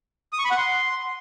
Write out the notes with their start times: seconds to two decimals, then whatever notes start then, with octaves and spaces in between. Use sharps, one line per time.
0.33 D#6
0.39 C#6
0.45 B5
0.51 F#5
0.57 C6